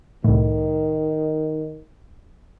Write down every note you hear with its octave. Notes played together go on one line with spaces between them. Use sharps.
C2 A2 D#3